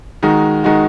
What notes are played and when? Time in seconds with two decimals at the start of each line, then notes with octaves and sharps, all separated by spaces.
0.23 D#3 G#3 D#4 F#4
0.64 D#3 G#3 D#4 F#4